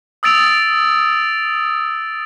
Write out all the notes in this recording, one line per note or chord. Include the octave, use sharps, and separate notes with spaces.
D#6 E6 A6 D7 F7